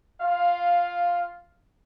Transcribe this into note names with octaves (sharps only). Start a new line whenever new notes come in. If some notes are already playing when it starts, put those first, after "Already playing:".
F4 F5